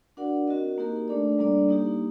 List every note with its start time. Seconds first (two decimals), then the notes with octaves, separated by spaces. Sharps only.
0.17 D4 F#4 A#4 D5 F#5
0.47 C4 F#4 A#4 D#5
0.78 A#3 D#4 G4 A#4
1.08 A3 D4 A4 D5
1.38 G3 A#3 D4 A4 D5
1.68 A#3 D#4 G4